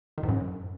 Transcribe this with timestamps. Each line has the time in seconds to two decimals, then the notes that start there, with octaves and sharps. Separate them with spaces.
0.18 D#3
0.23 G#2
0.29 F#2